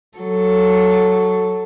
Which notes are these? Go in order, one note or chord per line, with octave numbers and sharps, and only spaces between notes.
F#3 A4